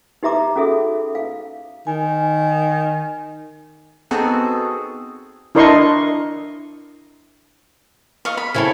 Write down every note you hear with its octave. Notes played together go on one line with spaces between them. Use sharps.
D#4 G4 E5 A#5 D6
C#4 F#4 G#4 A4 E5
F5
D#3 G#5
B3 C4 D#4 F#4 G#4 A4
D4 E4 A#4 D#5 C6 C#6
D#5 F5 C#6
B5
C#3 C4 E4 A4 C#5 G#5